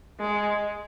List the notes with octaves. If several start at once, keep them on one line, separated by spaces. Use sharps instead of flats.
G#3